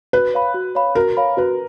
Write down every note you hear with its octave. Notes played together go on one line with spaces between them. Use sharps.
F#4 B4
C#5 F5 B5
F#4
C#5 F5 B5
F#4 A#4
C#5 F5 B5
F#4 B4